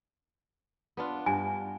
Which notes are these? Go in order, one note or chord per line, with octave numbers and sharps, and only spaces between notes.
B3 D4 F4
G2 G#5